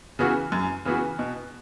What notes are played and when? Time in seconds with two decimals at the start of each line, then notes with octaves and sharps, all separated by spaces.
0.19 C#3 E3 B3 F#4
0.52 F#2
0.85 C#3 E3 B3 F#4
1.19 B2